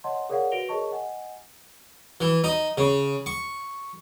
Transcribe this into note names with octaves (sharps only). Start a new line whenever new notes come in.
C#5 D#5 F#5 A5 C6
G#4 A#4 C#5 D5 F5 F#5
F#4 B4 A#6 D7 F7 G7
G#4 A#4 C#5 D#5 A5 C#6
D#5 F#5 G#5
E3
D#4
C#3
C#6